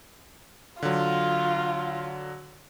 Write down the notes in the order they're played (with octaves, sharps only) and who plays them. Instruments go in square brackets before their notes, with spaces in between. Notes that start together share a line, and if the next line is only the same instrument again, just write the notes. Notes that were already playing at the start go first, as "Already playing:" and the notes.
[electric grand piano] D3 F#3 [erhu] F4